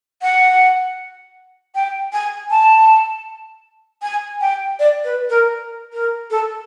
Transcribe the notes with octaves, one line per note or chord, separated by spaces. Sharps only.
F#5
G5
G#5
A5
G#5
G5
D5
B4
A#4
A#4
A4